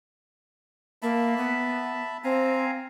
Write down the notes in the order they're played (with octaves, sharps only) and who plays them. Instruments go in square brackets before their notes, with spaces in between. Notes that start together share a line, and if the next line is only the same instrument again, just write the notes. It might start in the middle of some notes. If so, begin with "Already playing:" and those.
[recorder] A#3 [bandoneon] E5 A5 B5
[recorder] B3
[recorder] C4 [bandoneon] F5 G#5 A#5